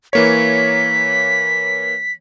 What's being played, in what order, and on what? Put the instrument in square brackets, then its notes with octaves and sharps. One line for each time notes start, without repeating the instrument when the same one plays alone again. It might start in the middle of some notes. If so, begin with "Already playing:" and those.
[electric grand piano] E3 A#3 C#5 [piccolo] B6